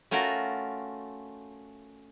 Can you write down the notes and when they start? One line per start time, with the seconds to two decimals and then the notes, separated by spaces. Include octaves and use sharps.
0.11 A3 C#4 F4 F#4 A#4